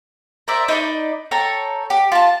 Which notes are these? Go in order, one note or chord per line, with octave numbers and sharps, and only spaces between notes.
A#4 C5 D5 E5
D#4 B4 C#5 D5
A4 C#5 G5 A#5
G4
F4 A5